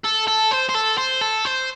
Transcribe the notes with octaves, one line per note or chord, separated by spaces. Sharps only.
A4
A4
C5
C5
A4
C5
A4
C5